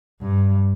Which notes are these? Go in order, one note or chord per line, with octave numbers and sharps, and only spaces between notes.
G2